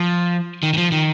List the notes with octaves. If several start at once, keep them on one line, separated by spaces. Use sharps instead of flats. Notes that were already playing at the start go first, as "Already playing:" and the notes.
Already playing: F3
D#3
D#3
F3
D#3